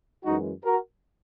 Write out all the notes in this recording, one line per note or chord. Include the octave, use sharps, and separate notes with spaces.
F#2 E3 G#3 D#4 F#4
F#4 A#4